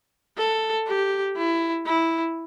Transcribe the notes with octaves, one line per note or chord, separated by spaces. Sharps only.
A4
G4
E4
E4